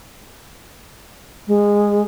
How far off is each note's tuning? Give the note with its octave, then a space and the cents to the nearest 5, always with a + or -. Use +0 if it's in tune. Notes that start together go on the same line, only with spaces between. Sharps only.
G#3 -20